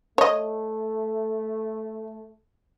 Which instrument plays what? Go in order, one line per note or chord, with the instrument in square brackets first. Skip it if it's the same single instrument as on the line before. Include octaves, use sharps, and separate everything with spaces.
[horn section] A3 [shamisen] C#5 D#5